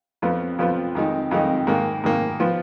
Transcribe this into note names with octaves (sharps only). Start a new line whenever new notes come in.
F2 F3 B3 F4
F2 F3 B3 F4
F2 D#3 G#3 D#4
F2 D#3 G#3 D#4
G#2 D#3 A#3
G#2 D#3 A#3
F3 B3 F4